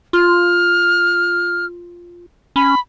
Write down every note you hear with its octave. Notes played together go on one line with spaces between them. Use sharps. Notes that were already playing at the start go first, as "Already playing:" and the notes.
F4 F6
C#4 B5